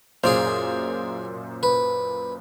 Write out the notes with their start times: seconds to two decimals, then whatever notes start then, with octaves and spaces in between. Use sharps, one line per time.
0.24 F#2 A#2 G#4 C5 D5 F5
1.63 B4